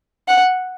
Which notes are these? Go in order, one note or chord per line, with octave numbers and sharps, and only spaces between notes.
F#5